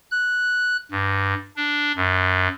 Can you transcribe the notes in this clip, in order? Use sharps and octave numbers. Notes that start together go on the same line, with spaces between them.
F#6
G2
D4
F#2